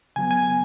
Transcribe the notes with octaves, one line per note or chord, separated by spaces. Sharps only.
C#3 F#3 B3 G#5
G#5